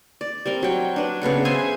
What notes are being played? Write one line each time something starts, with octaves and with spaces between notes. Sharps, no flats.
D5
G3 C4 A#4
F#3 G5
D4 B4
C#3 B3 A4 F#5
G#4 C5 E5 G#5